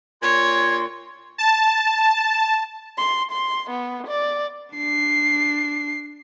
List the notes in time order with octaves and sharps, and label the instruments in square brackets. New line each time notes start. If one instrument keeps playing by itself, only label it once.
[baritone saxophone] A#2 [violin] C#5 [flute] C6 [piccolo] G#6
[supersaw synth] A5
[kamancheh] C6
C6
B3
D5
[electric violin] D4 C7